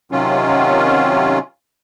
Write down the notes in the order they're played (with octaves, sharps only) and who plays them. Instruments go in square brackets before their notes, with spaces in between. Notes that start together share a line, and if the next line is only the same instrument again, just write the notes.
[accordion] C3 D#3 F#3 C#4 F4